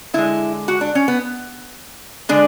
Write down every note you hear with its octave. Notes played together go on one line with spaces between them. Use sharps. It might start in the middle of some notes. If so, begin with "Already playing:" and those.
D3 G#3 E4
F#4
D4
C#4
B3
D3 G#3 D4